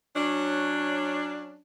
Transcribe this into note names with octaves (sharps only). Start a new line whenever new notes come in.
F#3 C#4 D4